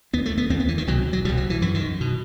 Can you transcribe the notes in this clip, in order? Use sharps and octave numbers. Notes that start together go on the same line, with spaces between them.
D#2 B3
A3
B3
D#2 C4
B3
E3
D#3
C2 B2 F#3
F#3
C2 B2 G3
F#3
E3
F#2 E3
D#3
B2